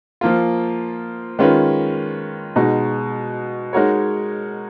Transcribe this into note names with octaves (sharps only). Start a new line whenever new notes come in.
F3 A#3 F4
D#3 G#3 C#4 F4 B4
B2 G#3 D#4 F#4
G#3 D#4 F#4 A#4 C#5